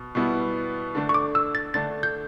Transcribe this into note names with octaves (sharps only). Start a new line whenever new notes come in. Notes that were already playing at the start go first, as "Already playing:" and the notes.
Already playing: B2
B2 G3 B3 E4
D3 A3 D4
C#6
D6
E6
A6
D3 A3 D4 A6
G6